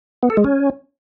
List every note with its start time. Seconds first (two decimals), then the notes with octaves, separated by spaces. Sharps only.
0.23 B3
0.30 A4
0.37 G#3
0.44 C#4